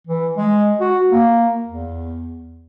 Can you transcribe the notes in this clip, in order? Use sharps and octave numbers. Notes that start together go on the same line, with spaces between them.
E3
G#3
F#4
A#3
E2